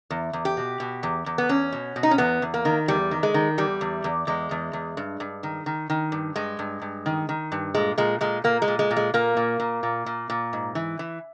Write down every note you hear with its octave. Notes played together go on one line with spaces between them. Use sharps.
E2
E2
G4
B2
B2
E2
E2
B3
E2 C#4
B2
B2
D#4
C#4
E2 B3
E2
A#3
D#3
E2 G3
D#3
G#3
D#3
E2 G3
E2
E2
E2 G#3
E2
E2
G2
G2
D#3
D#3
D#3
G2
G2 G#3
G2
G2
D#3
D#3
G2
A#2 G#3
A#2 G#3
A#2 G#3
A#2 A#3
G#3
A#2
G#3
A#2
G#3
A#2 A#3
A#2
A#2
A#2
A#2
A#2
G#2
E3
E3